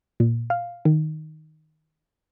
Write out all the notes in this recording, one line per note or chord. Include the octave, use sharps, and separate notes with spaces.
A#2
F5
D#3